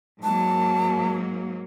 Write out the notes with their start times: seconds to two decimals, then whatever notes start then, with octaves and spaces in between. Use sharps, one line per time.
0.23 G#2 F#3 A#3 A5